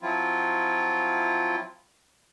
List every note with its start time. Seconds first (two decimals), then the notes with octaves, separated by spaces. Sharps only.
0.02 F3 F#3 C4 E4 F4